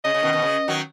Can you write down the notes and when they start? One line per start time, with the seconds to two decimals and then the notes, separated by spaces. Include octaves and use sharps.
0.04 C#3 D#5
0.14 C#3
0.23 B2 D#3
0.33 B2 D#3
0.42 C#3
0.68 D#3 F#3